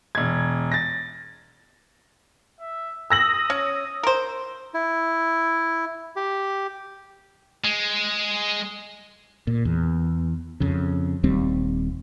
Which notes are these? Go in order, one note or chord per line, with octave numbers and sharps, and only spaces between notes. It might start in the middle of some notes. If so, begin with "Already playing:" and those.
E1 G#6
A6 A#6
E5
D#6 E6 A#6 F#7
C#4
A#4 C5
E4
G4
G#3
A#2
E2
F2 C#3
D#1 D#2 G3 C4